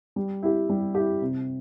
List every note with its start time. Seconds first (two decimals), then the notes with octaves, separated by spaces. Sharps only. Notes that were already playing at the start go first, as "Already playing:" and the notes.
0.16 G3
0.43 E4 G4
0.69 G3
0.95 E4 G4
1.22 C3